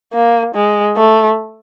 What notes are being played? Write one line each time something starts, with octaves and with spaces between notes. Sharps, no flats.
A#3
G#3
A3